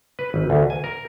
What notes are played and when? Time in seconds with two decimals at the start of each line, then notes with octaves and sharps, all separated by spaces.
0.19 B4
0.34 G#1
0.50 D2
0.70 G#5
0.84 A#4